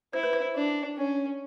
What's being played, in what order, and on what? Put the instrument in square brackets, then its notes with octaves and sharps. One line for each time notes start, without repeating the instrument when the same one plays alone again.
[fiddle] E4 [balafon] C5
[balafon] B4
C5
[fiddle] D4
C#4